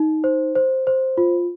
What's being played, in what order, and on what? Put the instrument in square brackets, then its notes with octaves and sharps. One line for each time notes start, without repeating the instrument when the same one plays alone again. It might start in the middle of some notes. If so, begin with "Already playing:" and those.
Already playing: [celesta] D#4
C5
C5
C5
F4